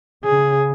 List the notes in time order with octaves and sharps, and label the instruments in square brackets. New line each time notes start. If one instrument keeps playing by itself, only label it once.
[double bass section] C#3 [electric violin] G#4